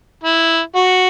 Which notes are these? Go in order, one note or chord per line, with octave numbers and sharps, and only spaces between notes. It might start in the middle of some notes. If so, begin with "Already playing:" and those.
E4
F#4